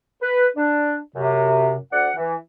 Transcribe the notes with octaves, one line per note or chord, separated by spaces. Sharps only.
B4
D4
F#2 C3
D2 D5 F#5
E3